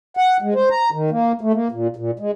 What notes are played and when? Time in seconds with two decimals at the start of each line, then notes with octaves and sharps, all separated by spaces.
0.17 F#5
0.42 G#3
0.55 C5
0.70 A#5
0.92 D#3
1.11 A#3
1.41 A3
1.53 A#3
1.72 A#2
1.96 A#2
2.19 G#3